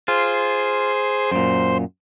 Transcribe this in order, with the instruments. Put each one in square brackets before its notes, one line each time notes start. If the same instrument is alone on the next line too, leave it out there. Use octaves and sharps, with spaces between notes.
[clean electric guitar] F4 [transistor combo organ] G#4 C5
[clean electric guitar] F#2 A#2 [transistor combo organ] C5